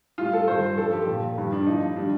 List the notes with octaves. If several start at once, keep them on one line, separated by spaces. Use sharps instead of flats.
A2 G3 F4
A4
G2 D#3 G3 C5
G2 F3 A4
G4
A#2 F3
G2 D#3 G3
D4
A2 F3 D#4
D#3 G3 D4